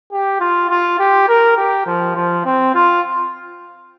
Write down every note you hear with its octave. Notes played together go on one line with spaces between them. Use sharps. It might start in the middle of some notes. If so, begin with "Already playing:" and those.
G4
F4
F4
G4
A#4
G4
F3
F3
C4
F4